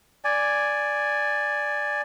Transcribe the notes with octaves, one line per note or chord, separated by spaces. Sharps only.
D5 G#5